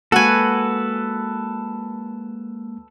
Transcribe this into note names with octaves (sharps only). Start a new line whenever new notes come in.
G#3 A#3 F#4 A4 B4 G#5